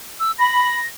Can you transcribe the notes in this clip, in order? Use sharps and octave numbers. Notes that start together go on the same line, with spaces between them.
E6
B5 A#6